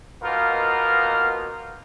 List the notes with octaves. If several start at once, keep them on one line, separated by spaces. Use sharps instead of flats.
B2 A#3 B3 D#4 F4 A#4